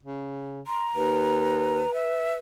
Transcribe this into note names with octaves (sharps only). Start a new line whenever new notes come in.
C#3
A#5 C6
D#2 B4
E5